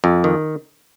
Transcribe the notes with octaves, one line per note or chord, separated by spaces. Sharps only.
F2
D#3